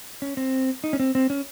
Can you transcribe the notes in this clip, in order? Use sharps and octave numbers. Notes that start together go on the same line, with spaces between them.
C#4
C4
D#4
C#4
C4
C4
C#4